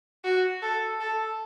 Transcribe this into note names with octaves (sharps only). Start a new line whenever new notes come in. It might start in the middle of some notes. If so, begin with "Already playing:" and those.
F#4
A4
A4